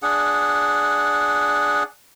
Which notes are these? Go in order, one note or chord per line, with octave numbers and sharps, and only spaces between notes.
D4 G#4 F#5